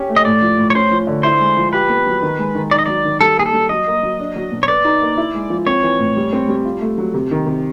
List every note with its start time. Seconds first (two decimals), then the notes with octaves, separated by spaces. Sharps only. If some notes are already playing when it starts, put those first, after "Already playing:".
Already playing: C#4 G4
0.09 A3
0.16 D#5
0.25 A2 D5
0.42 F3
0.58 A2
0.70 C#5
0.75 C#4 C5
0.91 F3
1.07 D3
1.23 E4 C5
1.40 G#3
1.57 F3
1.73 G4 B4
1.90 B3
2.06 F#3
2.22 D#3
2.39 G#3
2.55 D#3
2.71 D#4 D5
2.79 D#5
2.86 F#3 D5
3.05 D#3
3.21 G3 A4
3.37 A#3 G#4
3.46 A4
3.53 G3
3.69 F#3 D#5
3.87 A#3
4.03 F#3
4.19 D4
4.36 F#3
4.52 B2
4.63 C#5
4.68 B4 D5
4.85 D#4
5.02 A#3
5.17 E4
5.34 G#3
5.50 F3
5.67 C4 C#5
5.83 E3
5.99 A2
6.16 G3
6.33 C4
6.48 G3
6.65 F4
6.81 A3
6.98 F#3
7.14 C3
7.31 D#3
7.46 C3